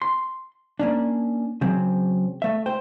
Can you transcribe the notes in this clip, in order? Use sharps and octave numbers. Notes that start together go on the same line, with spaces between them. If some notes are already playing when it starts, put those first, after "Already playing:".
C6
A#3 C#4 D4
C#3 F#3 C4
A3 E5
C5 G5